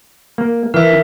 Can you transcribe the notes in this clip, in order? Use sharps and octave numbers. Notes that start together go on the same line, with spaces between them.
A#3
E3 A#4 E5